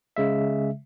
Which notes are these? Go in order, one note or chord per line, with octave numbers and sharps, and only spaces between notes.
C#3 G#3 E5